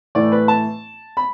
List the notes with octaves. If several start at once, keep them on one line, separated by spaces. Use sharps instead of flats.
A2 E3 A3 D5
B4
A5
B5